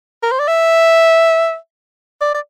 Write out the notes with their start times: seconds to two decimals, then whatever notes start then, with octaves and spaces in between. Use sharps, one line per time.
0.23 A#4
0.32 C5
0.39 D5
0.47 E5
2.21 D5
2.34 D5